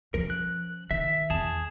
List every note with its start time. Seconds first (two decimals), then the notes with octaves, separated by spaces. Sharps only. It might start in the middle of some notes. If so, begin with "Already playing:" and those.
0.14 F3 C#4 A#4
0.30 F#6
0.91 D#3 E5
1.30 E2 G#4 A5